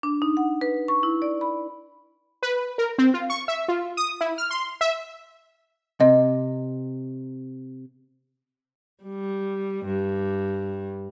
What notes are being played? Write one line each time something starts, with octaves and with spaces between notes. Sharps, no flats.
D4
D#4
F#5
B4
C#6
E4
D5
B5
B4
A#4
C4
F4
C#6
E5
F4
D#6
E4
F6
C6
E5
C3 D#5
G3
G2